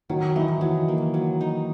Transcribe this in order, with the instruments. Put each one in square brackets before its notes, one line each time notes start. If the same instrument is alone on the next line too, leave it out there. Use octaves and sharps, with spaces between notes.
[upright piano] D#3 [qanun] F#3
[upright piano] E3 [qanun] D#4
[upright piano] E3 [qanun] F#3
[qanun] A#3
F#3
D#4